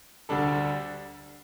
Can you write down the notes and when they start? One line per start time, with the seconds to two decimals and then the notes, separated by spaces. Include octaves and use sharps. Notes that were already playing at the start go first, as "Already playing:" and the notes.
0.29 D2 D3 G3 D4 A4